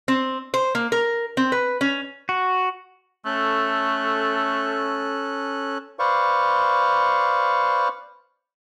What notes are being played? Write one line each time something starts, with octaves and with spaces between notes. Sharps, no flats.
C4
C5
A#3
A#4
C4
B4
C#4
F#4
A3 C#4 A4 F#6
B4 C5 D5 F5 C#6